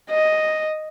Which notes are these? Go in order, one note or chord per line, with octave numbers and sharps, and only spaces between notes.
D#5